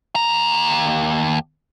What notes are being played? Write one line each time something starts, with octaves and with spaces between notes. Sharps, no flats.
D#2 A#5